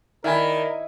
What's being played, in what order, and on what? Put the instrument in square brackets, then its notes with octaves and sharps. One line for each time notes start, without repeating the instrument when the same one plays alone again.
[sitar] D#3 [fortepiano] E4 G#5 [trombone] A#4 [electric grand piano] D5 E5 B5